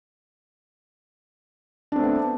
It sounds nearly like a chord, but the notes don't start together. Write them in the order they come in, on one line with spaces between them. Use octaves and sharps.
D4 C4 A3 B3